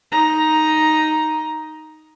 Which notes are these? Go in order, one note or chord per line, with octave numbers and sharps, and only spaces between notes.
D#4 A#5